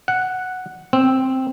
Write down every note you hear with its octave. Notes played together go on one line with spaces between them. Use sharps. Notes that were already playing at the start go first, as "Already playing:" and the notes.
F#5
C4